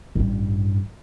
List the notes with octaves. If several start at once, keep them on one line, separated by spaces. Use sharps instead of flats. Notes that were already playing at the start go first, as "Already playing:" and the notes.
A1 G2